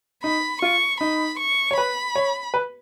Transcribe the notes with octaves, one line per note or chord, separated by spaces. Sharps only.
D#4 B5
F4 C#6
D#4 B5
C#6
C#5
B4 B5
C#5
B4